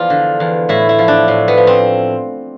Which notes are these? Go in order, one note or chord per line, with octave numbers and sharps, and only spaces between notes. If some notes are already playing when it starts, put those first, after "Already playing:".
Already playing: E2 F3 F4 D5
D3
E2
A2 E4
E4
F3
D4
A2
B3
F3
C4